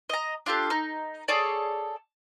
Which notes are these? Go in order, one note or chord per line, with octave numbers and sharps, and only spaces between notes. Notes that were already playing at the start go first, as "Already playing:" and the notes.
D#5 A#5
D4 F4 G4 A4
D#4
G#4 A4 C#5 D5